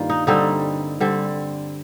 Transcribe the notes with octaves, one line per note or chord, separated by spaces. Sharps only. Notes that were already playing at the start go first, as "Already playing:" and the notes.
Already playing: G2 D#3 A#3 F4
D#4
D3 G3 C4 D#4
D3 G3 C4